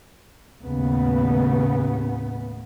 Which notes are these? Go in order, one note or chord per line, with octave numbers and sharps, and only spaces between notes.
D#2 A2 C#3 B3